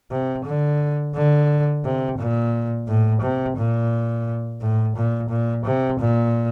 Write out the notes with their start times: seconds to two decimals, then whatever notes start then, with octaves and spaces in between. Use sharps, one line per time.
0.12 C3
0.45 D3
1.15 D3
1.84 C3
2.19 A#2
2.88 A2
3.22 C3
3.58 A#2
4.61 A2
4.96 A#2
5.30 A#2
5.66 C3
6.00 A#2